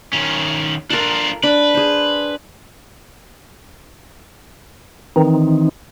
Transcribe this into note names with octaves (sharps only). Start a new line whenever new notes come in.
D#3 C#4
D4 F4 A4 A#4
D4 B4
G#4 C5
D#3 E3 C4 D#4